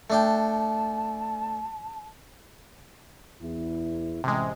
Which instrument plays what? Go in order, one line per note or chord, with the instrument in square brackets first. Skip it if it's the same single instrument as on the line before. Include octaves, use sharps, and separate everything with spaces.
[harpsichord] A3 D4 G5 [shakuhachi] A5
[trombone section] E2 E4
[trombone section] A1 [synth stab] C3 G#3